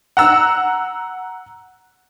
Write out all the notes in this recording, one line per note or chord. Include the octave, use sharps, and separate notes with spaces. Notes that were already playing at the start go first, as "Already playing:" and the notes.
F#5 A#5 E6